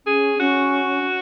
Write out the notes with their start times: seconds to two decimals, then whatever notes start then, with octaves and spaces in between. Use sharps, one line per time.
0.06 C#4 G#4
0.39 C#4 F#4